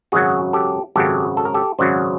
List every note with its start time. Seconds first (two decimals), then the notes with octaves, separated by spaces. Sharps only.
0.12 G#1 F#2 C#3 F#3 F#4 G#4
0.53 G4 A4
0.96 G#1 F#2 C#3 F#3 G4 A4
1.37 A4
1.45 A#4
1.54 G4 A4
1.79 G#1 F#2 C#3 F#3 C5 D5